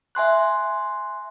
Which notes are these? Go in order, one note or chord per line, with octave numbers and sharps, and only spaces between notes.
E5 G#5 C6 F#6